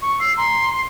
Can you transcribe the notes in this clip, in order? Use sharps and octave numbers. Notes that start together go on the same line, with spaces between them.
C#6
E6 C7
A#5 C6